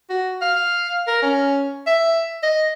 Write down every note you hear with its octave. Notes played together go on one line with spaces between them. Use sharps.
F#4
F5
A#4
C#4
E5
D#5